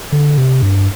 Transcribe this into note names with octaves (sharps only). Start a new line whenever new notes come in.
D3
C3
G2